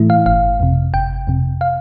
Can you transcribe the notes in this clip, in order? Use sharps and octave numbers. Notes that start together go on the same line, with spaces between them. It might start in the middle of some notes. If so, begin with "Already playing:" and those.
Already playing: A2 E3 A3 E4
F5
G1 F5
F2 C3
G1 G5
F2 C3
F5